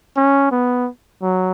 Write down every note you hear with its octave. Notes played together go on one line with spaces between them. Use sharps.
C#4
B3
F#3